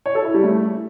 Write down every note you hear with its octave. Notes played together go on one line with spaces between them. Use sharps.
C#5
A4
E4
G3
A3